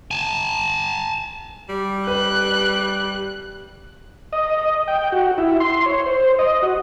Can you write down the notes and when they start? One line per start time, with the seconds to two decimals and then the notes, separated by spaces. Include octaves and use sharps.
0.11 G#5 A5
1.69 G3
2.07 B4 F#6
4.33 D#5
4.88 G5
5.12 F#4
5.38 E4
5.60 C6
5.86 C#5
6.06 C5
6.39 D#5
6.62 F#4